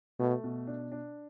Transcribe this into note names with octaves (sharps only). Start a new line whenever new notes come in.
B2 A3
B2
D4
D4